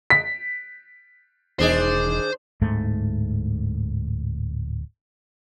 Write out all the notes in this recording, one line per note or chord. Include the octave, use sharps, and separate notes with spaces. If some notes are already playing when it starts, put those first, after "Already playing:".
B6
E1 D#3 D4 G#4 C5
D1 G#2 A3